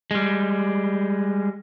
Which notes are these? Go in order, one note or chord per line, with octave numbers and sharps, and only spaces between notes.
G3 G#3